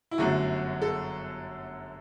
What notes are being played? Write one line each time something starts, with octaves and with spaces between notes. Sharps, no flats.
E4
G1 F#2 D3 F#3 A3 F#4
A4